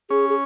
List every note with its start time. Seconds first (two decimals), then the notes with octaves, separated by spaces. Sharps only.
0.10 C#4 G#4
0.30 G#4